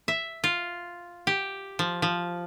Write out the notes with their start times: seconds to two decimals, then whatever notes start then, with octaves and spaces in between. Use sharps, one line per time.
0.08 E5
0.44 F4
1.27 G4
1.79 F3
2.02 F3